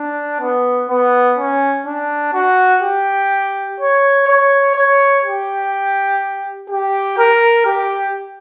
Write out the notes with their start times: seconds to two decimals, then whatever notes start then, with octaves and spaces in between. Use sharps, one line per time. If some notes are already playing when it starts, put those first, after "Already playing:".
Already playing: D4
0.40 B3
0.89 B3
1.38 C#4
1.86 D4
2.34 F#4
2.82 G4
3.80 C#5
4.28 C#5
4.76 C#5
5.24 G4
6.70 G4
7.18 A#4
7.65 G4